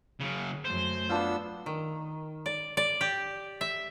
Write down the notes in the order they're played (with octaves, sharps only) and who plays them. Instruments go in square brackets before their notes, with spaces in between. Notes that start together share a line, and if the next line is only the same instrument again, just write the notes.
[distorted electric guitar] C#3 F#3
[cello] F#2 A3 [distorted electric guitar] C5
[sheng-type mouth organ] B3 D4 E6 [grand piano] F4 A5
[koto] D#3
D5
D5
G4
E5